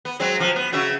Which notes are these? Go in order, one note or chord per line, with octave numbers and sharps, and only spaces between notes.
B3
F#3 G#3 C4
C3 F3
B3
C#3 F#4 E5